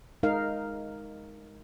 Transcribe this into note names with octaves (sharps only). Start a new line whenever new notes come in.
G#3 D#4 A#4 F5